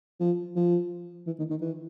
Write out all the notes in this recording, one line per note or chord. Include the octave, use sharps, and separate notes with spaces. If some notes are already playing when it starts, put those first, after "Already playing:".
F3
F3
E3
D#3
D#3
E3